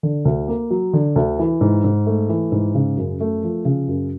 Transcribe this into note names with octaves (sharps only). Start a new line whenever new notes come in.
D3
D2
A#3
F#3
D3
D2
E3
G#2
G#2
A3
E3
G#2
C#3
F#2
A3
F3
C#3
F#2